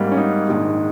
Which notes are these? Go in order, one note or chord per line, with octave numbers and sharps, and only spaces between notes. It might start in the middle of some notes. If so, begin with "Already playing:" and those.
Already playing: G#1 G#2 G3 A#3
C#4
D#4
A#1 G#2 D#3 G#3